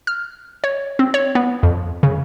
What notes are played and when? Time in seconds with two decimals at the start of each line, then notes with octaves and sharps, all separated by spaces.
0.07 F6
0.64 C#5
0.99 C4
1.14 C#5
1.35 B3
1.63 F2
2.03 C#3